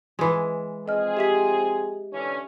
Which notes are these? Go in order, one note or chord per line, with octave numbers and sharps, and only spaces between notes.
E3 G#3
F3 C4 G#4 D#5 F6
G4 E5 B6
D3 E3 C#4